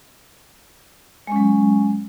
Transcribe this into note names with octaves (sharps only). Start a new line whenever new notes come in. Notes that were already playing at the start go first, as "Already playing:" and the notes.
F#3 G#3 C#4